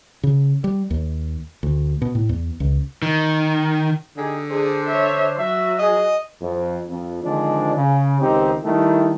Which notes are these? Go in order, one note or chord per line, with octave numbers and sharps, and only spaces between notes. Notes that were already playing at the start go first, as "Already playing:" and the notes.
C#3
G3
D#2
D2
B2
A2
E2
C#2
D#3
D3 D#4 G4 G#4
D4 G#4 C5
C#5 E5
F#3 F#4 E5
G#4 D#5
F2
F2
D3 D#3 F3 G#3 C4 D4
C#3
C#2 D#3 C4 D#4 G4
D#3 G3 A3 E4